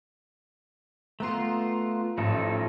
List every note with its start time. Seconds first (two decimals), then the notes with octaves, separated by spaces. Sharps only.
1.20 A3 B3 F4 A#5 C6
2.18 A1 F3 D#4 A4